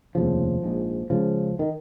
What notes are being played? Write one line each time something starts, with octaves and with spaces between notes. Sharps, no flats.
F1 D#2 C#3 F3
A#1 G#2
C#2 C#3 F3
D#3